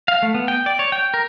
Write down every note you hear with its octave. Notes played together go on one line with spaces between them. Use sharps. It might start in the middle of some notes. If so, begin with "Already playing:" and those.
F5
A3
B3
G5
D5
C#5
G5
A#4